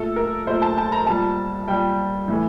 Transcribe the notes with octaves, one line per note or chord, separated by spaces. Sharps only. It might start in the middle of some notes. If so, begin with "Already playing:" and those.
Already playing: A#2 A3 A4
A#4
A#2 A3 C5
A5
A5
A#5
A#2 G3 A5
A#2 G3 G5
A2 E3 A3